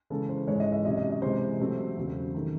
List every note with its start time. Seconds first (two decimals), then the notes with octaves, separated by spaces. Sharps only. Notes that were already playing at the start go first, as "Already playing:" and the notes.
0.10 C#3 E3 G#3 C#4 A4
0.29 C5
0.47 G#2 E3 G#3 C#5
0.60 D#5
0.72 E5
0.85 C3 F#3 C#4 D#5
0.97 D#5
1.10 D#5
1.22 C3 E3 G#3 C5
1.59 C3 F#3 A3 C4
1.97 E2 C#3 F#3
2.34 C3 D#3 A3